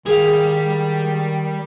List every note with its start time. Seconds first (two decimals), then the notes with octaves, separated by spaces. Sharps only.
0.06 D#3 G3 G#4 F5